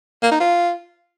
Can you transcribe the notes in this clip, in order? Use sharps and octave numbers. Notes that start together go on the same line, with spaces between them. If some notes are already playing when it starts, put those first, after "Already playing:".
A#3
D#4
F4